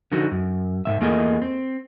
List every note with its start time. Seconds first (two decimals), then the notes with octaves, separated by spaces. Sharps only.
0.12 D3 F3 D#4 F#4
0.31 F#2
0.85 G#2 F3 E5
1.00 E2 A3 A#3 F4 G#4 D#5
1.42 C4